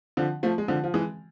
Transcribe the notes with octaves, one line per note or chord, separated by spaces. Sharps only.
D3 F3
F3 A3
G#3
D3 F3
F3
E3 G#3